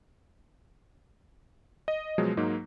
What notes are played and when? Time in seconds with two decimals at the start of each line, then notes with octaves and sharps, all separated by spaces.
1.88 D#5
2.18 B2 F3 F#3 G#3
2.37 G#2 F#3 A#3 D#4